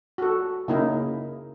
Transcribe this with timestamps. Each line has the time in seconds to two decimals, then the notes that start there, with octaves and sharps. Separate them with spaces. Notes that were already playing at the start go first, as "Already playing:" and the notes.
0.18 F#4 A4
0.68 C#3 A#3 D#4 E4 A#4